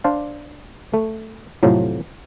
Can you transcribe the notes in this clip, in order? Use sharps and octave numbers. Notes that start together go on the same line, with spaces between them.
D4 C5 D5 F5
A3
F2 A2 C3 F3 F#3